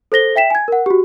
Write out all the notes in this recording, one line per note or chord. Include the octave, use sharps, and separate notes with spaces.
A4 C5 A#6 G7
E5 G5 B6 E7
G#5 G#6
A#4 F#5
F#4 G4